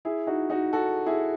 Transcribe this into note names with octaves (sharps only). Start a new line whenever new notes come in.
E4 G#4
D#4 F#4
D#4 F#4
F#4 A4
E4 G#4